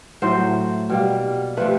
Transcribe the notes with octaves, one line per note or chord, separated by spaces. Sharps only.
A2 F#3 A3 C5
B2 G3 A#3
C3 F3 A3 B4